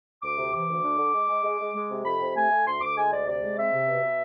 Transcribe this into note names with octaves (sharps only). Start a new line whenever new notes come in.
D2 D6
C3
E3 D6
D2
D4
D3
G#3
G#3
G#3
G#3
G#3
C3
F2 B5
C3
A3 G#5
A3
D2 C6
D2 D6
G#3 G#5
D2 D5
C3 D5
G#3
C4 E5
C3
B2
B2